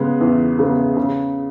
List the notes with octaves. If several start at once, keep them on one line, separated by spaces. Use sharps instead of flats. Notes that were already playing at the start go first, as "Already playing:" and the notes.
Already playing: C#3 G#3 B3
E2
C#3 G#3 B3
C#3